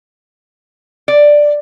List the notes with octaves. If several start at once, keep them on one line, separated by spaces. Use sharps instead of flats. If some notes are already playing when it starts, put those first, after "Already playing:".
D5